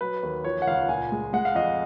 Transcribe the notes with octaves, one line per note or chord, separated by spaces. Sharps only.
F#3 B4
D#2
F3 C#5
F#5
C#2 F5
A#2 G#5
G#3
G#3 F#5
F5
F2 D#5